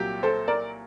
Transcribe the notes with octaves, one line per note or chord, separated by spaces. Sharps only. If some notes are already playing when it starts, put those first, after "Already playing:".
Already playing: C2 A#2 F#3 G4
A4 C5
A#4 D5